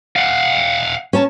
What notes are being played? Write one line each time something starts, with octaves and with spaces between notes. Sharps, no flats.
F5 F#5
C#4 C#5 A5